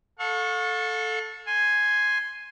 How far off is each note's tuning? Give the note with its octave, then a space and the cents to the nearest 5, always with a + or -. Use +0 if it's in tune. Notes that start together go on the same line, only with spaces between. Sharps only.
A4 +0 F5 +45 C#6 -15
G#5 +0 C6 +0